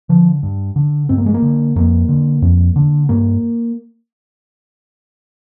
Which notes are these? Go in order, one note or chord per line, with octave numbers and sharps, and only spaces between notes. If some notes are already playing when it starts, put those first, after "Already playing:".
D3 F3
G2
D3
G2 C4
A#3
G#3
A#3
D3
F2 A#3
D3
F2
D3
G2 A#3